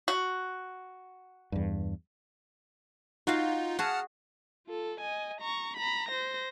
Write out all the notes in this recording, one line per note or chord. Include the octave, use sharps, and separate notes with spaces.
F#4
E2 G2
D#4 F4 F#4 F5
F#4 G#4 F#5 A5 F6
F4 A4
D#5 G#5
A#5 C#6
A#5 B5
C5 A#6